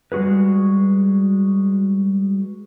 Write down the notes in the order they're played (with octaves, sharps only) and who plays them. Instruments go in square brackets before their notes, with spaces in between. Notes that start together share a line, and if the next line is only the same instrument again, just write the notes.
[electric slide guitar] G3 G#3 F#4 G#4 B4